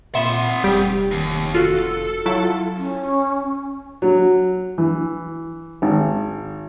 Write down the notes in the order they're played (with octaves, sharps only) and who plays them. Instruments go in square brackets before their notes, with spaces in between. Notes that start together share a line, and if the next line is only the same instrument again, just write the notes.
[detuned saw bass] A#2 [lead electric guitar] C4 F#5 [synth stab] E5 B5 C6
[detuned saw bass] F1 [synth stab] G3 G4
[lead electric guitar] D#2
[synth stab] F4 F#4 [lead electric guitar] A4
[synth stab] F#3 E4 A5 [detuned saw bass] F4
[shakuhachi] C#4
[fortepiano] F#3
E3
G#1